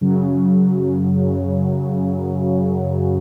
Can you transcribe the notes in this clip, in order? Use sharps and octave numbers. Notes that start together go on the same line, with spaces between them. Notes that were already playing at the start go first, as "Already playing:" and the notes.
F#2 C#3 F#3